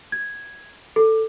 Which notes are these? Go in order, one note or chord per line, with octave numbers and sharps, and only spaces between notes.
G#6
A4